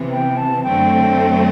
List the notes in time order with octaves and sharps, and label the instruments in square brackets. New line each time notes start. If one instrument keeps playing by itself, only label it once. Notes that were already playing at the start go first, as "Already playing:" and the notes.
Already playing: [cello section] C3 E3 B3
[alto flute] G5
A5
[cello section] F#2 D3 F#3 A3 C4 [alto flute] G5